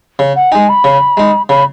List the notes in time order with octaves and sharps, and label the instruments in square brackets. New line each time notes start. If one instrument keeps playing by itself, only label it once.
[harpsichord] C#3
[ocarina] F#5
[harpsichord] G#3 D#4 [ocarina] G#5
[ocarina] B5
[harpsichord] C#3
G#3 D#4
[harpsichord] C#3 [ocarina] B5